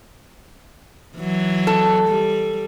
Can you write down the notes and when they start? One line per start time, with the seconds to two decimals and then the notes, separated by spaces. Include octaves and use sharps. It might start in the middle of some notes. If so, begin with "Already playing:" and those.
1.17 E3 F#3
1.67 A4
2.08 G3